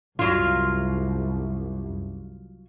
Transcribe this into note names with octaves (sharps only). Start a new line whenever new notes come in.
C2 F#2 F#3 F4